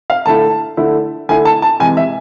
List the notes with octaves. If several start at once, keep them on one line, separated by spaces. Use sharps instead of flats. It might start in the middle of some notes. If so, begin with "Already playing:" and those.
F5
D3 A3 E4 A5
D3 A3 E4
D3 A3 E4 G#5
A5
A5
C3 E3 G#3 G#5
E5